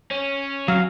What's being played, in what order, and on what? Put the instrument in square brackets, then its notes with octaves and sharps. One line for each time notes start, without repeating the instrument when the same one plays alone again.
[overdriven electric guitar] C#4
[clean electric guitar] F#3 [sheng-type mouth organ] F5